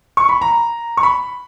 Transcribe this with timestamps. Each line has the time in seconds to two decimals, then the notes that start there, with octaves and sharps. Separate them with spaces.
0.17 C#6
0.29 B5
0.42 A#5
0.97 C#6
1.03 B5